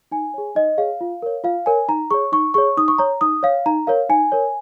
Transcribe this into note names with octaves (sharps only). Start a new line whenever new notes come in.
D#4 G#5
G#4 C#5
D#4 D#5
G#4 C#5 F5
F4
A#4 C#5
F4 F5
A#4 C#5 G#5
D#4 A#5
G#4 C#5 C#6
D#4 C#6
G#4 C#5 C#6
D#4 D#6
C#6
C#5 A#5
D#4 D#6
C#5 F5
D#4 A#5
A#4 C#5 F5
D#4 G#5
A#4 C#5